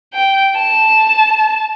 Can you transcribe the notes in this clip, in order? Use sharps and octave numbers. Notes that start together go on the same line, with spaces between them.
G5
A5